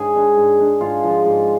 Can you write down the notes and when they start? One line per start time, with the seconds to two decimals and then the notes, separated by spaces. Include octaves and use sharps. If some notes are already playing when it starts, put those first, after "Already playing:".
Already playing: G#2 G#4 G#5
0.15 G#3 D4
0.37 G#2
0.60 G#3 D4
0.81 G#2 F4 F5
1.03 F3 G#3
1.25 G#2